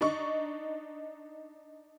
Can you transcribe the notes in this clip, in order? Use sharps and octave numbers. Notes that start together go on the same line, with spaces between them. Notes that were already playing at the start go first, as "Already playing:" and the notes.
D4 D#4 C#6